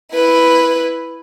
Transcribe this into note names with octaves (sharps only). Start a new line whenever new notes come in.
E4 B4